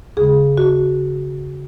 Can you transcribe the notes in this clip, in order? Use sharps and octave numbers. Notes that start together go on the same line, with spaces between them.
D#2 C#3 G#3 G#4
F#4